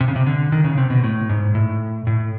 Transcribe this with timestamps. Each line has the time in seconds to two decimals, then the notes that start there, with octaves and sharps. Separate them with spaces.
0.01 C3
0.08 C#3
0.16 C3
0.27 D3
0.52 D#3
0.64 C#3
0.78 C3
0.90 B2
1.04 A2
1.29 G#2
1.55 A2
2.07 A2